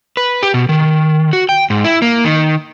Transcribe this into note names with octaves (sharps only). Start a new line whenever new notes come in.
B4
G4
B2
D#3
F#4
G5
G#2
E4
A#3
D#3